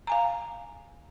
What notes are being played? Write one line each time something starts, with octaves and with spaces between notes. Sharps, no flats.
F5 G#5 A#5